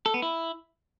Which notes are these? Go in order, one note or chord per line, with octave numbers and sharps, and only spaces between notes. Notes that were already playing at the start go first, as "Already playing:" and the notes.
A4
B3
E4